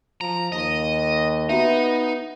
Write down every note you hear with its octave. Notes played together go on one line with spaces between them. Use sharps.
F3 A#5
D#2 D#5
B3 D#4 F#4 E5